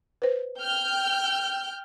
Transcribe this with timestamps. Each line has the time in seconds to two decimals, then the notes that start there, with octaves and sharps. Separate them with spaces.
0.22 B4 C5
0.58 G5 F6 G6